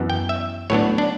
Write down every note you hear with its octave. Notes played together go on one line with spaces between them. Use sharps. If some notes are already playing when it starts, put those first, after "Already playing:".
Already playing: F#2 E3 B3
G5
E5
A2 F#3 B3 D4 C#5
D4